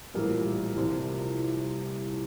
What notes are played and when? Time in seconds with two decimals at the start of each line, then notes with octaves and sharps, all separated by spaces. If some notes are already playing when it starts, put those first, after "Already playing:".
0.14 A#1 A2 E3 G3 A#4
0.76 C2 C3 F3